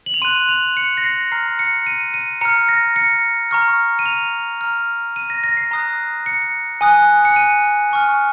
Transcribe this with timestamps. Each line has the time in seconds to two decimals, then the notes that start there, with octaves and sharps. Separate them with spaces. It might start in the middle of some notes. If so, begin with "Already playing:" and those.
0.06 F#7
0.14 F7
0.22 C6 F#6 D#7
0.49 F7
0.77 C#7
0.97 A#6
1.04 C7
1.32 A#5 F6 C7
1.59 C#7
1.87 D#7
2.14 D#7
2.41 A#5 F6 C#7
2.69 A#6
2.96 C#7
3.51 A#5 C#6 F6
3.99 D#7
4.06 F7
4.61 A#5 F6
5.16 D#7
5.30 A#6
5.44 A#6
5.57 C7
5.71 A#5 D#6 F#6
6.26 C#7
6.81 G#5 D#6 F#6
7.25 C#7
7.36 D#7
7.91 G#5 C#6 F6